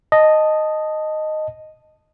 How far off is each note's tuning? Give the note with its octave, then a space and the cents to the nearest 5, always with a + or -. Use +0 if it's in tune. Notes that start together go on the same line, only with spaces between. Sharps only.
D#5 -5 A5 +0